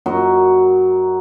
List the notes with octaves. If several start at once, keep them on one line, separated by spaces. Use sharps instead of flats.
F#2 F#4 A#4 D#5